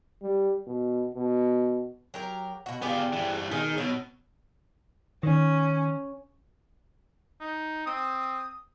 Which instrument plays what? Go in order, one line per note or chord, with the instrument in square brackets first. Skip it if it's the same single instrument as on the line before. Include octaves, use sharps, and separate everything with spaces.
[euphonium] G3
B2
B2
[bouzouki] F#3 G4 A#4
B2 F#4
[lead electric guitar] B3 F4 [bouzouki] G4 G#4 D5
[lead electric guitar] G2 E3
[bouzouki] B2 G#4 [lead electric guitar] D#3
[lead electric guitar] B2 [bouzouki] F#3
[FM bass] D#3 [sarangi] C#4
[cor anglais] D#4
[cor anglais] C4 [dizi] D#6